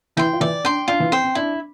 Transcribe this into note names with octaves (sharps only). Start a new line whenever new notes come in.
E3 E4 G5 C6
F4
E3 E4 D5
D4 G5 C6
D4 F4
E3 E4
C4 C5 G5
C4
D4 E4